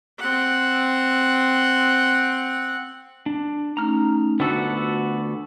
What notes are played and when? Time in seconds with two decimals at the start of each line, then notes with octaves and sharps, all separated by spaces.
0.19 C4 F#5
3.26 D4
3.77 A3 C#4 D#4 A#5 F6
4.40 D2 B3 F4 F#4 A4 C#6 D6